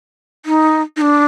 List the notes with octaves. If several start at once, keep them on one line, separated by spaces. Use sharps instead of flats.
D#4
D#4
D4